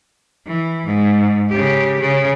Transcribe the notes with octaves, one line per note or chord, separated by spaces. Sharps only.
E3
G#2
C#3 G4
C#3